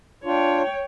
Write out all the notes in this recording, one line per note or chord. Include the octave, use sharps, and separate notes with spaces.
D4 F4 C#5 G5